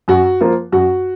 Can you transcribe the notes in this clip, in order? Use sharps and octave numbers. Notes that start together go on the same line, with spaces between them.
F#2 F#4
F3 A#3 F4
F#2 F#4